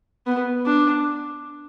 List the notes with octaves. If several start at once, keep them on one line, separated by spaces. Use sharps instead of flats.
B3
D4